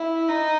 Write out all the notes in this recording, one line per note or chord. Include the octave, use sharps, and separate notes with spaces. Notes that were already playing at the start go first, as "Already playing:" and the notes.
Already playing: E4
D#4